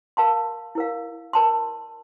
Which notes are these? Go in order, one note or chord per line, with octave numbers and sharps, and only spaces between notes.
A#4 F5 A5 C6
E4 A#4 F5
A#4 D5 A5 C6